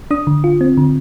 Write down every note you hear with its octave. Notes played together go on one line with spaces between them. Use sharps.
D4 D#6
D3
F4
C4
D3